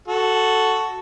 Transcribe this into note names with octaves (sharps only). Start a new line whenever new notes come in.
F#4 A4